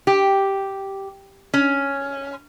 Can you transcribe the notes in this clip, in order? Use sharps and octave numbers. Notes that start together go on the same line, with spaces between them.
G4
C#4